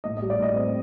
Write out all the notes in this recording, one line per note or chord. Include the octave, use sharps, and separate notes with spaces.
A2 D#5
D#5
G3
D5
A2 D#5
C4